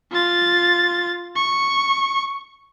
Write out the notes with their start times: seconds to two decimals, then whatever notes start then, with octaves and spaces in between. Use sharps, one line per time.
0.11 F4 A6
1.35 C#6